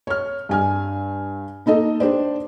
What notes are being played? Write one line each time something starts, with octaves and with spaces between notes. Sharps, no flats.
C#5 F6
G2 G#5 F6
A#3 D#4 A4 D#5
D4 G4 C5 D5